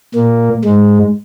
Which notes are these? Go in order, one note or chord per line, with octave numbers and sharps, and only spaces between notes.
A#2 A#3
G#2 G#3